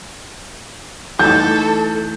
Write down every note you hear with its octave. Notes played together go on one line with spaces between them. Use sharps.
E3 A3 D#4 A4 G6